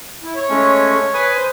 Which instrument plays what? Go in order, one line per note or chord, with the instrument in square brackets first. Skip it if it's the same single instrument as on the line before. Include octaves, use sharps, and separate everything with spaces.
[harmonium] E4
C#5
[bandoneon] G#3 A3 C#4
B4 G#5 D#6
[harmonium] C5